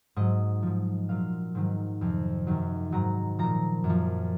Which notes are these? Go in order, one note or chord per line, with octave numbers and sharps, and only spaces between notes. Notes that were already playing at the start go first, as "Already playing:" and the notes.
G#2 F#3 D#5
G#2 F3
A#2 F#3 F5
G#2 D#3 F#3
F2 C3 F3
F#2 D#3 F#3
G#2 D#3 F#3 A#5
A#2 F3 A#5
F#2
F3